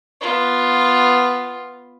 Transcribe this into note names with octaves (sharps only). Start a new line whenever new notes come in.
B3 F4